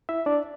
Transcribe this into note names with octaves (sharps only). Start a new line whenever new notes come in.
E4 E5
D4 D5